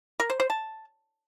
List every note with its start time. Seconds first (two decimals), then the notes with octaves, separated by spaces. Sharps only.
0.20 A#4
0.30 C5
0.40 C5
0.50 A5